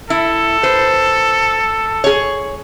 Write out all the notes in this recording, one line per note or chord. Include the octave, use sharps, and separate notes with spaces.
E4 A4
B4 C5
G#4 C#5